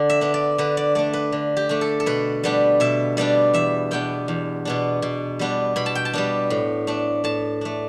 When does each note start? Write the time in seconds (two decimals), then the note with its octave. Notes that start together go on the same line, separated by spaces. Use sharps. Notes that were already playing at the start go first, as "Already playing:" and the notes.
Already playing: D3 D5
0.10 E5
0.21 B3 D4
0.34 D5
0.58 D3 B4
0.77 D5
0.95 A3 D4 D5
1.13 B4
1.32 D3
1.57 G4
1.69 A3 D4
1.81 A4
2.00 A4
2.06 B2 B4
2.44 G3 B3 D4
2.80 B2 E5
3.17 G3 B3 D4 D5
3.54 E2 E5
3.91 B2 B3 D4 G5
4.28 E2
4.65 B2 B3 D4
5.02 B2
5.39 G3 B3 D4
5.76 B2 B5
5.86 A5
5.95 G5
6.05 A5
6.13 G3 B3 D4
6.50 A2
6.87 A3 D4
7.24 A2 A5
7.61 A3 D4